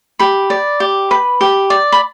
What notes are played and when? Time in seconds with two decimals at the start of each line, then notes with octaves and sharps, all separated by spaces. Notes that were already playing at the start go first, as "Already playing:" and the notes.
0.19 G4 B5
0.50 D5
0.80 G4
1.11 B4
1.41 G4
1.70 D5
1.92 B5